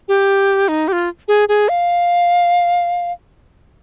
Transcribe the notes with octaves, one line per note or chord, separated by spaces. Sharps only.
G4
D#4
G4
F4
G#4
G#4
F5